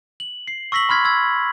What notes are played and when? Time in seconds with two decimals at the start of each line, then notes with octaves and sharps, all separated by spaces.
0.20 F#7
0.48 C7
0.72 C#6 E6 A#6 B6 F#7
0.89 B5 C6 F6 G#6 B6
1.04 B5 E6 G#6